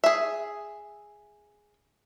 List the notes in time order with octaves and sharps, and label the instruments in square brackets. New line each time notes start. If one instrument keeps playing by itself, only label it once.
[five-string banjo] G#4 E5